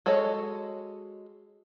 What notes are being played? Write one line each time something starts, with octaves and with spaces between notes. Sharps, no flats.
G#3 F#4 A4 C#5 D#5